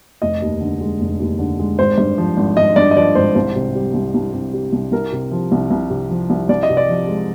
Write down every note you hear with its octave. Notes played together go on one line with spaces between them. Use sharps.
F1 D#5
D#2
D3
G#3
F1
D#2
D3
G#3
G#1 C5
G2
F3
G#1
G#1 D#5
G2 D5
D#5
F3 D5
G#1 C5
C2 C5
C3
G3
C2
C2
C3
G3
C2
C2 A#4
C3
F3
C2
C2
C3
F3
C2
C2 D5
D#5
C3
D5
F3
G#3